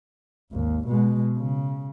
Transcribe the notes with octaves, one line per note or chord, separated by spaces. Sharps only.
G#1 D#2
B2 G#3
C#3